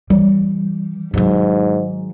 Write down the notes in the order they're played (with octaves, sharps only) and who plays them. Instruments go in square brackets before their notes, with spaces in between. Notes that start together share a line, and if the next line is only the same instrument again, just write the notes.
[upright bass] E3 [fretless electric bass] G3
[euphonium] G#2 [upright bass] D#3 F#3